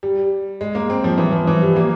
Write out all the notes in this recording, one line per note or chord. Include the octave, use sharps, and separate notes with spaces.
G3
G#3
A#3
C4
F3
E3
F3
E3
G3
A#3